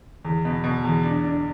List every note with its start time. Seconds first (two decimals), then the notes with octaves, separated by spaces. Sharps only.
0.25 E2
0.45 B2
0.64 B2
0.84 E2
1.03 D4
1.24 D4